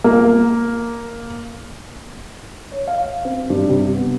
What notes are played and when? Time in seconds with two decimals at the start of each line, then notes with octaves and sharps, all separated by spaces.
0.04 A#3
2.72 C#5
2.87 F5
3.25 C4
3.50 G2
3.69 C3
3.95 B3